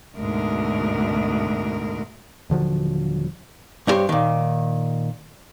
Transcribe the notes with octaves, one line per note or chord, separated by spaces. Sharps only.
D2 G#2 B2 A#4
D#1 D3 F3 F#3
G2 D#4 G4 A#4 C5 C#5
A#2 D#3